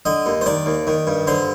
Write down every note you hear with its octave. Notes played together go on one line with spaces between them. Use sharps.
D3 D#5
D#2
C5
D#3 D5
D#2
D#3
G2
D3 C5